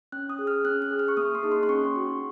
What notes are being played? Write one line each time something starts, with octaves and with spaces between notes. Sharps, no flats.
C#4 F#6
D#6
G#4
F6
C#4 F#6
F#6
G#4
F6
C#6
A#3 D#6
C6
D#4 G#4
C6
C6
C#4 C#6
F#4